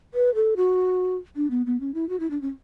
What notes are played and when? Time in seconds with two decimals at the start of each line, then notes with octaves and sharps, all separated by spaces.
0.14 B4
0.35 A4
0.57 F#4
1.36 D4
1.50 B3
1.66 B3
1.80 C#4
1.94 E4
2.09 F#4
2.20 E4
2.30 D4
2.42 C#4